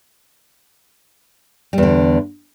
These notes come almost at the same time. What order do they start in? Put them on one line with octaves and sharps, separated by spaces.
G3 E2 D3